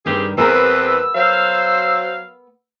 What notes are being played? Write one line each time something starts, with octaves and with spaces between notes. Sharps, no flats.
G2 D#3 G3 C4 G4 G#4
E2 B3 C4 G#4 A#4 B4 E6
F#3 C5 F5